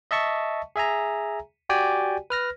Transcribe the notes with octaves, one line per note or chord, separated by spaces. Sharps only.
D#5 E5 A5 C#6
G#4 E5 G#5 A#5
F#4 G4 D5 G5 G#5
B4 F6 A#6